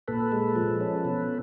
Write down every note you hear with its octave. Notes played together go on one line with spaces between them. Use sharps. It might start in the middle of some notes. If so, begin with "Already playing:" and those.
A#2 A4 B4
G#3
F3
C#4
B2